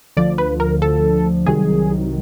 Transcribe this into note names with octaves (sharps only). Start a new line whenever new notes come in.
D2 D3 F3 D5
B4
A#4
A4
C2 C3 D#3 F#3 G#4